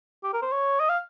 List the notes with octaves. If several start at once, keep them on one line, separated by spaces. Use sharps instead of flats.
G4
A#4
C5
C#5
D#5
F5